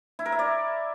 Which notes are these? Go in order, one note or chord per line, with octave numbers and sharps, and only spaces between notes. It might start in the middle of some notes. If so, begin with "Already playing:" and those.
E4
A#4
E5
D5